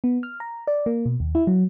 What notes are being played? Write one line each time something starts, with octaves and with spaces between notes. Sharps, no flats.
B3
F6
A#5
D5
A#3
B2
D#2
E4
F#3